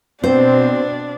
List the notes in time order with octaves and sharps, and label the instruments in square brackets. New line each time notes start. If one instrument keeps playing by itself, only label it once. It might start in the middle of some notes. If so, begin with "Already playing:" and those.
[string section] B2 [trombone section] C4 [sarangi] D4 [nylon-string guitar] C5